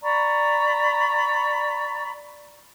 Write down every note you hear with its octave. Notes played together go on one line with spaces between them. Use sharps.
D5 A#5 B5 C#6